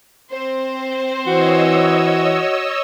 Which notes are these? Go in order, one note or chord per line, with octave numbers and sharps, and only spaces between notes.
C4 C5
E3 F#4 C#5 D#5 E6